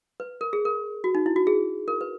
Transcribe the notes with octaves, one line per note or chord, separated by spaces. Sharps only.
B4
A#4
G#4
A#4
F#4
D#4
E4
F#4
G#4
A#4
B4